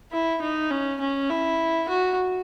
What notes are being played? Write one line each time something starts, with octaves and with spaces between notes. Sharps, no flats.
E4
D#4
C#4
C#4
E4
F#4